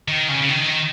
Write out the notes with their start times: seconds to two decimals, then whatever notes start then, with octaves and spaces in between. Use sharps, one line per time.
0.08 D#3
0.29 C#3
0.42 C#3
0.49 D#3